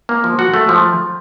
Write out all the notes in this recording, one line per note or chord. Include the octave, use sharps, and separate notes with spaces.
A#3
F3
F#4
A3
F3